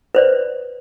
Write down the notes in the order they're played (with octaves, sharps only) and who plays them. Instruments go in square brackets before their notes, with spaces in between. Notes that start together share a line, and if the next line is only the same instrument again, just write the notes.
[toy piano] B4 C5 D5